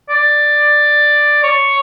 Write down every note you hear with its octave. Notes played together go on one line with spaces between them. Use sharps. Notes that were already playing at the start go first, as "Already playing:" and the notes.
D5
C#5